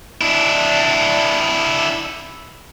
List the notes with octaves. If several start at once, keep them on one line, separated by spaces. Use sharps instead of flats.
D4 E4